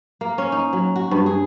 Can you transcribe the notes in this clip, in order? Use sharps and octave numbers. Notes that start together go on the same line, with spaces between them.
A#3
C#4
D#4
F#3
F#4
G2
G#4